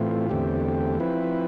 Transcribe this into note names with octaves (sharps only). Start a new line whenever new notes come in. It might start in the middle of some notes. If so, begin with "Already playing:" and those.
Already playing: A2 E3 A3 C4 F4
E2 D3 A3 C4 G4
F3 C4 E4 B4